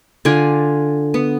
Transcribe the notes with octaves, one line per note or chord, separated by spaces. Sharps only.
D3 F4 D5 G#5
B3